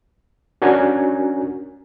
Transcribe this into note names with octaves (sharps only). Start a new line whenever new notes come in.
C#4 D4 F#4 A#4 F#5 G#5